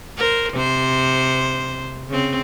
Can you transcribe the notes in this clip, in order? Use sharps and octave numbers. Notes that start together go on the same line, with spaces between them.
A#4 C5
C3 C5
C#3 C4